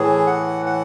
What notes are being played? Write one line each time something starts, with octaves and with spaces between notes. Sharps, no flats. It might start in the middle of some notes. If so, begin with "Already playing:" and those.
Already playing: A2 E3 G#4
F#5
F#5